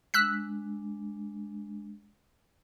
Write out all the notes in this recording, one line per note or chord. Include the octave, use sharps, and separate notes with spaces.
G#3 D4 E6 F#6 B6